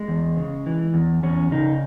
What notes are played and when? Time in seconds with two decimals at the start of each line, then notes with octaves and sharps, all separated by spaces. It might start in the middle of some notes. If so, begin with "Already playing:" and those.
Already playing: G#3
0.08 E2
0.37 C#3
0.66 E3
0.94 E2
1.23 E2 C#4
1.51 C#3 D#4